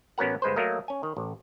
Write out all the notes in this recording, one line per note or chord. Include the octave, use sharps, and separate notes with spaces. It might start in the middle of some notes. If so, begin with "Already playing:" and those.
A1 B3 C#4 F#4 A#4 F#5
G1 G#3 B4 C5
F#3 A3 A#3 A#4 D#5
C#4 G#5
D#3
A1